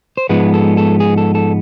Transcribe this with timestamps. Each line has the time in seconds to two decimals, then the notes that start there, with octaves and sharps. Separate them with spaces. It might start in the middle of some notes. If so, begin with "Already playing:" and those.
0.17 C5
0.29 G#2 F3 G#3 B3 B4
0.54 A4
0.77 A4
1.00 G#4
1.18 A4
1.35 A4